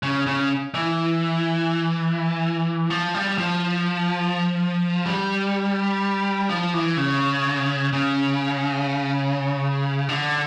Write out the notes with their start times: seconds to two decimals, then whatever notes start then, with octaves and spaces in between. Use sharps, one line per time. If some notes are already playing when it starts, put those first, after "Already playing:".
0.03 C#3
0.27 C#3
0.74 E3
2.90 F3
3.14 G3
3.38 F3
5.06 G3
6.49 F3
6.74 E3
6.97 C#3
7.93 C#3
10.09 D3